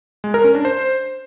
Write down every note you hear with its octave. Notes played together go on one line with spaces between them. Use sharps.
G#3
A#4
C#4
D4
C5